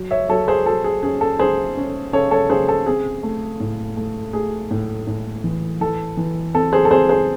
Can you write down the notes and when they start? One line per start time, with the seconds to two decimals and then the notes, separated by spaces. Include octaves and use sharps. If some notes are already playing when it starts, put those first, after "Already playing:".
Already playing: F#3
0.11 C#5 E5
0.29 F#3 A4 C#5
0.48 G#4 C5
0.66 F#3 A4
0.84 G#4
1.03 C#4 G#4
1.21 A4
1.39 C#3 G#4 C5
1.77 C#4
2.13 C#3 A4 C#5
2.31 A4 C#5
2.50 C#3 G#4 C5
2.69 A4
2.86 C4 G#4
3.23 A3
3.60 A2
3.97 A3
4.33 A3 G#4
4.71 A2
5.07 A2
5.44 E3
5.81 E3 A4
6.17 E3
6.54 C4 A4
6.73 G#4 C5
6.85 A4
6.91 C4 G#4 C5
7.09 G#4 C5